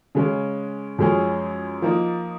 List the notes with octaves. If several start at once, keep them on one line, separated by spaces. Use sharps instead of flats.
C#3 G#3 C#4
F#2 F3 G#3 C#4 G#4
F3 A#3 D#4